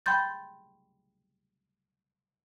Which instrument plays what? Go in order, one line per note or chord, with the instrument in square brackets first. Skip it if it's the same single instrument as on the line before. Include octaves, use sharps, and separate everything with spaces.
[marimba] G5 B5 C6 G6 A6